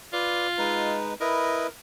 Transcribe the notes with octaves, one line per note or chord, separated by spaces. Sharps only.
F4 B4 D5
G#3 D#4 B4
E4 A#4 B4 D#5